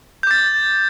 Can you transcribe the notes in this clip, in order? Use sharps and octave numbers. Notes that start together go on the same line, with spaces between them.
D6 G6 A6